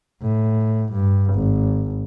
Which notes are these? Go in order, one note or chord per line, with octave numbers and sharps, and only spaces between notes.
A2
G2
G#1